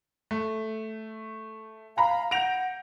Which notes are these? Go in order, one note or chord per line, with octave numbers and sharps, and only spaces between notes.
A3
F5 G#5 A#5 B5
F#5 G6 A#6 D7 F7